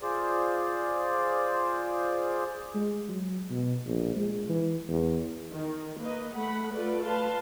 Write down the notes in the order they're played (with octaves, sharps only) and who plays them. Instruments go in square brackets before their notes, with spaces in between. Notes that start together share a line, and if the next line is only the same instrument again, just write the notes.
[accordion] F4 G#4 C5 D5
[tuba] G#3
F#3
B2
A#1
G#3
E3
E2
[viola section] D#3
A#3 B4 D#5
A3 F#5 B5
A3 F4 A4 B4 D5
B4 F5 A5 C6